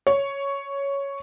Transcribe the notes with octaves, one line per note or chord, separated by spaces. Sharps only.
C#5